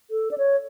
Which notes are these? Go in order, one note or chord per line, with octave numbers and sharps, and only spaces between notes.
A4
D5
C#5